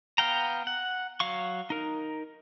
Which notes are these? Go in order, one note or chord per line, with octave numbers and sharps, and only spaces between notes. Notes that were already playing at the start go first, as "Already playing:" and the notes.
B3 F5 G5 A#5
F#5
F#3 F5 C#6
D#4 A#4